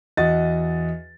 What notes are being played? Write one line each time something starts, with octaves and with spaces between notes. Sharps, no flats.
E2 F#4 D#5 A6